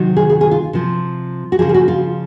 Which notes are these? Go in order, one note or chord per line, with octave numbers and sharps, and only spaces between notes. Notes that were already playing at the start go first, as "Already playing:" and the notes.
Already playing: C3 D#3 F#3
G#4
G#4
G#4
F4
C3 F3
F#4
C#3 F3 G#4
G#4
F#4
F4